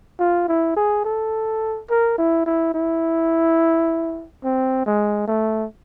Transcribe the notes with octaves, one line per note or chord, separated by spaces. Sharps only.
F4
E4
G#4
A4
A#4
E4
E4
E4
C4
G#3
A3